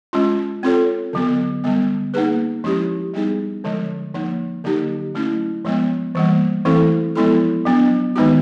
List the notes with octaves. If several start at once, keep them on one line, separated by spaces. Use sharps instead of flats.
G#3 C#4 F4
C4 F4 A4 C#5
D3 F#3 B3
D3 G3 B3
A#3 D#4 G#4 B4
F3 G#3 C#4 E4 G4
G3 B3 D#4 G#4
D3 F3 G#3
F3 A#3 D#4
D3 F#3 A#3 D#4 G4
F#3 A3 C#4 E4
F3 G#3 B3
E3 G3 A#3
E3 A3 C4 E4 A4
F3 G#3 B3 E4 A4
F#3 B3 D4
D#3 G#3 B3 D#4 F#4